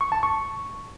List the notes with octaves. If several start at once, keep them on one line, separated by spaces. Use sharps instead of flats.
C#6
A5
C#6